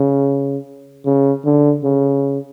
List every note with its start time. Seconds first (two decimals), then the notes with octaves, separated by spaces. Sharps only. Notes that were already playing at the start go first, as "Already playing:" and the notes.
Already playing: C#3
1.06 C#3
1.45 D3
1.84 C#3